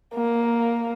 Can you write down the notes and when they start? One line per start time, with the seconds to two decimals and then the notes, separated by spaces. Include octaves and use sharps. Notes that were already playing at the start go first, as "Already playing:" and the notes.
0.14 A#3